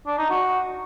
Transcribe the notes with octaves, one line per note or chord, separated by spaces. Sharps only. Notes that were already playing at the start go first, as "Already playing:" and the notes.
D4
D#4
F#4